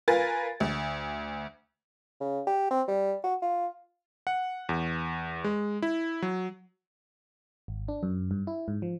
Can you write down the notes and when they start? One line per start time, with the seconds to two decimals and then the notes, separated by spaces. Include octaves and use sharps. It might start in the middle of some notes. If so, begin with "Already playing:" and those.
0.08 F4 A#4 B4 G#5 A6
0.60 D2
2.20 C#3
2.47 G4
2.71 C4
2.88 G3
3.23 F#4
3.42 F4
4.27 F#5
4.69 E2
5.44 G#3
5.82 E4
6.22 F#3
7.68 G#1
7.88 D4
8.03 F#2
8.31 G2
8.47 E4
8.68 G#2
8.82 F3